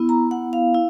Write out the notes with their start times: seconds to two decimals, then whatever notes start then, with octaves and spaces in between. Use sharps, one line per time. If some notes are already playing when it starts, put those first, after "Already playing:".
Already playing: B3 E4
0.09 A#5
0.31 F#5
0.53 F5
0.74 E4